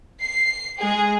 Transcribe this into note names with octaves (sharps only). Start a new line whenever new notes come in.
C7
G#3 G#4